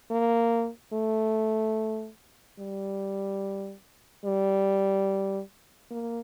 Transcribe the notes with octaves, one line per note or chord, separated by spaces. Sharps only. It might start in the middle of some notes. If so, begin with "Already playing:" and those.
A#3
A3
G3
G3
A#3